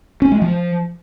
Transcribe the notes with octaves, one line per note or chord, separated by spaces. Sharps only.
C#4
G#3
F3